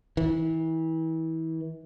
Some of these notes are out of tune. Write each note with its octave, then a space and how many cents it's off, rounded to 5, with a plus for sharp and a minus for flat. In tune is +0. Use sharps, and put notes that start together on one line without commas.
E3 -30